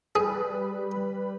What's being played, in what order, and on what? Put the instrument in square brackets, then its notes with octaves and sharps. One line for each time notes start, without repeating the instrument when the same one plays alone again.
[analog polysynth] G3 B4 B5 [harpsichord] G#4